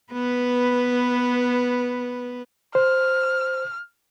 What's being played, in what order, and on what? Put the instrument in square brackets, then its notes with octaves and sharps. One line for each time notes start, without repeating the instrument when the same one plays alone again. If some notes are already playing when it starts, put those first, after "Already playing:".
[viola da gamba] B3 B4
[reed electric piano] C5 [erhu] F6